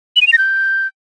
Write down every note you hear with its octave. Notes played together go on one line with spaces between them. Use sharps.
F#7
D#7
F7
A#6
G6